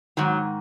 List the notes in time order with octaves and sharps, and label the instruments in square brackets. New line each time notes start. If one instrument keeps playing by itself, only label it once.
[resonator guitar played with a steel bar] G#2 D#3 F#3